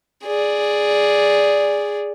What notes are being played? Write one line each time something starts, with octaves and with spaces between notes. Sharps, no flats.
G#4 D5